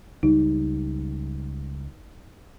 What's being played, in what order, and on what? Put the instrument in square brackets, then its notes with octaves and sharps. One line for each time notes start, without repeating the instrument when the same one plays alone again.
[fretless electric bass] C#2 G3 [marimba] D#4